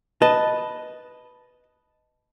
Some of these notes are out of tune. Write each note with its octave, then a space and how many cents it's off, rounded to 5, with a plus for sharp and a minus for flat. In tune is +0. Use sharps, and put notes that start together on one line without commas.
B4 +0 D#5 +0 A5 +0